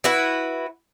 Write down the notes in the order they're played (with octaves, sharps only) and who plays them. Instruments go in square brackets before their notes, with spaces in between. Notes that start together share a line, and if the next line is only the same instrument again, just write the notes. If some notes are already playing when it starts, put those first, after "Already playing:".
[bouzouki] E4 F#4 B4